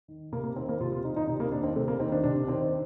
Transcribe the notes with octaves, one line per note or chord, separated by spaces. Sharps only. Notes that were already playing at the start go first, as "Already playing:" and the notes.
D#3
C3 A#3
A#3
D#3 C4
A#3
C3 F4
F4
D#3 D#4
D#4
C3 D#4
A#3
D#3 D4
C4
C3 A3
A#3
D#3 C4
D4
C3 D4
D#3 C4